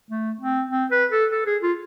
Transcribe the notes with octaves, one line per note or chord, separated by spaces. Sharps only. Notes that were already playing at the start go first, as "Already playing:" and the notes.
A3
C4
C4
B4
A4
A4
G#4
F4